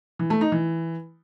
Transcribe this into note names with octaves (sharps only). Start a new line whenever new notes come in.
E3
A3
D#4
E3